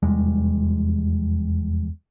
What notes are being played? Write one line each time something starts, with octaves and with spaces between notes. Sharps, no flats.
F1 E2 G3 G#3